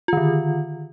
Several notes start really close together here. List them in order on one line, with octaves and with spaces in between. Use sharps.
F4 D#3 D3